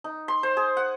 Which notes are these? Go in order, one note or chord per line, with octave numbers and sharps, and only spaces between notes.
D#4
C6
C5
G#4
F#5